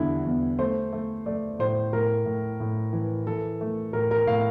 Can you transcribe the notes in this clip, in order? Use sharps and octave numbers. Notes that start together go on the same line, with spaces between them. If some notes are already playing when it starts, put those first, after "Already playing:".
Already playing: E2 D3 G3 E4
E2
A3 C5
A3
A3 D5
A2 C5
A2 A#4
A2
A2
E3
E3 A4
A3
A2 A#4
A#4
A2 F5